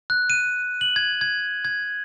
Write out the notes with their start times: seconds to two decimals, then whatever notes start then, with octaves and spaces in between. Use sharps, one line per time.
0.10 F#6
0.30 D#7
0.81 F#7
0.96 G#6
1.21 G#6
1.65 G#6